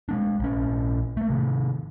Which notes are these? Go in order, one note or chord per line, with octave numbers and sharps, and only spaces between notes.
G#3 A#3 D4
A#1 C#4
A3 A#3
C3 D#3